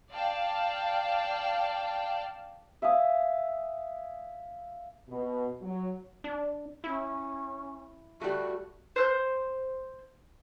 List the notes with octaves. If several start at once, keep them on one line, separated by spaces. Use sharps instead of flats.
D5 F5 G5 A5
E5 F5 G#5 D#6
B2
F#3
D4
C#4 E4
G3 A3 F#4
C5 F#6 G6